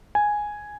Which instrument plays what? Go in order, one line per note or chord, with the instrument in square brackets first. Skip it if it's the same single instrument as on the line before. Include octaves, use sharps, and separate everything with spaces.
[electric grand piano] G#5